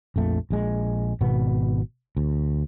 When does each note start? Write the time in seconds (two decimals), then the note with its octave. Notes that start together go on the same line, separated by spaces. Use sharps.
0.16 A#1 F2 A3
0.50 A#1 G#3
1.21 G#1 B2 B3
2.17 D2